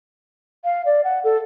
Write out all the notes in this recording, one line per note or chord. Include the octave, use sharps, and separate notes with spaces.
F5
D5
F#5
A4